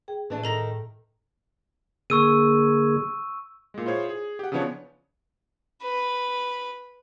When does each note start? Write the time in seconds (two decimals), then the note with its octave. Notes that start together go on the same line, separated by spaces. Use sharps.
0.08 G#4 G5
0.30 A2 E3 D4
0.44 D#3 A4 A#5 A#6
2.10 D3 A#3 G#4 C#6 E6 D#7
3.74 A#2 G#3
3.86 E4 F4 G#4 C5 C#5
4.09 G#4
4.39 G4 F#5
4.52 C#3 E3 F3 B3 D4 C#5
5.82 B4